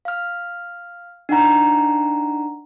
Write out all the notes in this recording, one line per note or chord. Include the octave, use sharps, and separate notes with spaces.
F5 F6
D4 D#4 F#5 A#5